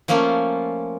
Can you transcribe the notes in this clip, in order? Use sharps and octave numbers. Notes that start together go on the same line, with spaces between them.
F3 A3 A#3 C#4 F4